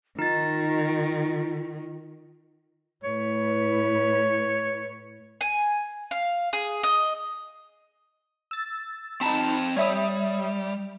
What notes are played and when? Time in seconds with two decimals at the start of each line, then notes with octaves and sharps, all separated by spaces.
0.19 D#3 D#4 F4 A6
3.04 A2 E4 B4 C#5
5.41 G#5
6.11 F5
6.53 G#4
6.83 D#5
8.51 E6 A6
9.21 C4 D#4 A5 B5
9.76 G3 C#5 E5 D#6